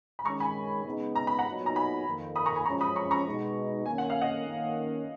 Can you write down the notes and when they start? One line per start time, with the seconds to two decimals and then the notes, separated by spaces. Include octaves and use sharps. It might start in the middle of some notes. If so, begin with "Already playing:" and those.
0.19 B5
0.25 D#3 G#3 C#4 A#5 C#6
0.40 G#5 B5
0.85 C#3 G#3 B3 D#4
1.15 A#5
1.27 B5
1.39 F#5 A#5
1.46 A#2 F#3 B3 D#4
1.66 A#5
1.75 G#5 B5
2.06 F2 D#3 A#3
2.36 B5 D#6
2.46 A#5 C#6
2.56 G#5 B5
2.66 F#2 F3 G#3 C#4 A#5 C#6
2.81 B5 D#6
2.96 A#5 C#6
3.11 A#5 C#6
3.26 B2 G#3 D#4
3.86 D#3 A#3 C#4 G#5
3.98 F#5
4.10 F5
4.22 D#5 F#5
4.46 D#3 A#3 C#4